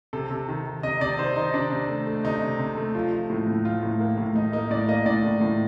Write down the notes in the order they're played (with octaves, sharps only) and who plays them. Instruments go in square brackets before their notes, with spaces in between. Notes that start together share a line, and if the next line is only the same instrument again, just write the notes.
[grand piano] C3 A4
C3
D#3
D#3
C3 D#5
C3 D5
D#3 C5
D#3 D#4
C3 D4
C3
A3
A3
C3 D#4
C3
C3
A3
F3
F3
A2
A2
F3 F4
A2
A#3
A2
A2 D#4
A#3 D#4
A2 D5
A#3 D#5
A2 D5
A2
A2